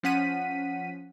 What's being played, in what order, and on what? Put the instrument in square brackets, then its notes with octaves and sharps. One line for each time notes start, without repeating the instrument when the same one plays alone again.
[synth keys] F3 C#4 F#5 B6 D#7